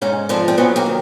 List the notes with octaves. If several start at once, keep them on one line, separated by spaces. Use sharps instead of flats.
G#2 C#4 D#4
F3 C4 D4
C4
F#3 B3 C#4
A#3 C4
D#3